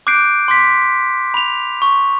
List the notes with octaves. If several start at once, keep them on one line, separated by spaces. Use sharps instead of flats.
D6 F#6 G6 C7 D7
C6 D6 B6
B5 F7
C#6